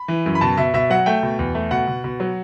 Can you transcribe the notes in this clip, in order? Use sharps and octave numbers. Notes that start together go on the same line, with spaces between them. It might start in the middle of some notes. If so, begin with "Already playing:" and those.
Already playing: B5
E3
F#2
B5
B2 A5
B2 E5
B2 E5
F#3 F#5
A3 G5
B2
E2
A3
B2 F#5
B2
B2
F#3